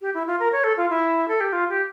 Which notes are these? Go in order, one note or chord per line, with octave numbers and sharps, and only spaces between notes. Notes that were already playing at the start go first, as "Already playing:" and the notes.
G4
E4
F4
A#4
C#5
A4
F4
E4
A4
G4
F4
G4